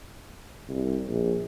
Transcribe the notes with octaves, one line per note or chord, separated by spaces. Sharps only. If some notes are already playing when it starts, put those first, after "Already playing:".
C2
A#1